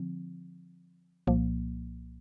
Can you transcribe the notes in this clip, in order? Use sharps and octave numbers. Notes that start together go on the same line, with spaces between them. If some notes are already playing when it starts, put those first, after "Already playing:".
Already playing: D3 F3 C4
C2 A#2 F3 A#3